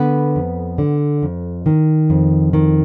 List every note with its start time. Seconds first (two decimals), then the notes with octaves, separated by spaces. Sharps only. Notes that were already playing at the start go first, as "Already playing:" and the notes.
Already playing: D3 B3 B4
0.36 F2
0.78 D3
1.22 F2
1.66 D#3
2.10 F2
2.53 D#3